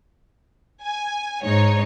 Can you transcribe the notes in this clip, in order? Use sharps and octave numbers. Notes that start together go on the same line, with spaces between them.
G#5
G#2 D#4 C#5